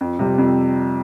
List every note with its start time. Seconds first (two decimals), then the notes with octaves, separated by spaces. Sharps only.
0.01 F2
0.19 C3 G3
0.38 F2